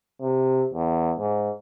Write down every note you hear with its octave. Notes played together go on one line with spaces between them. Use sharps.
C3
E2
G#2